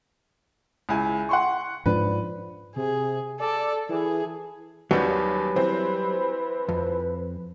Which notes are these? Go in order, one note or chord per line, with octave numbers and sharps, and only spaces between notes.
C#2 E4 G#5
F#5 C6 C#6
G#2 F3 D4 B4
C3 G#4
A4 D5
E3 G#4
D#2 F#3 G3 C#4 B4
E3 C4
F2